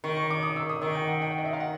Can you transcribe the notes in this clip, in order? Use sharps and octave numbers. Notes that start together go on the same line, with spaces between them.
D#3 C#6
C#6
D6
D#6
E6
D#6
D#3 C#6
G5
F#5
G5
D#5
E5
F5
F#5